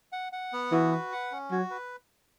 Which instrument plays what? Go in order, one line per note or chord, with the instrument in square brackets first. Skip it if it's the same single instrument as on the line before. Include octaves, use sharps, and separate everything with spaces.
[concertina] F#5
F#5
B3
[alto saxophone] E3 [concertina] F#4
[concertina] B4
F#5
C#4
[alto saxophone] F#3 [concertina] F#4
[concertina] B4